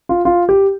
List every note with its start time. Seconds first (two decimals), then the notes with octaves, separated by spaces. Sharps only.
0.09 F4
0.25 F4
0.49 G4